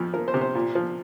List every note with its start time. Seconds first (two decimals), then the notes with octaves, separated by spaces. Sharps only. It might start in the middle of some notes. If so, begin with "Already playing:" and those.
Already playing: F2 F3
0.14 F3 A#4
0.28 C5
0.34 C3
0.41 C5
0.55 A#2
0.75 F3